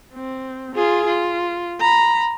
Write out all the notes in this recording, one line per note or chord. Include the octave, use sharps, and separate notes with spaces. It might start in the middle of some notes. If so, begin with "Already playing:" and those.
C4
F4 G#4
F4
A#5 B5